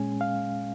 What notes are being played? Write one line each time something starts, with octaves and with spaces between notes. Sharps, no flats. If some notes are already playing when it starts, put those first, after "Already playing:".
Already playing: A#2 G#3 C#4 G#5
F5